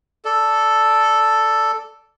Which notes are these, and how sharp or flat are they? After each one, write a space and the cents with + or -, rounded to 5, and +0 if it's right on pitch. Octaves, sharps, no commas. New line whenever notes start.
A4 +0 D5 +0